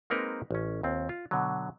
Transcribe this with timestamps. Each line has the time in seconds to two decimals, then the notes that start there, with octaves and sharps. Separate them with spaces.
0.10 G#3 A#3 C4 D#4 A#4 B4
0.51 A1 C#4
0.83 D#2 C4 F4
1.09 F4
1.31 B2 D3 F#3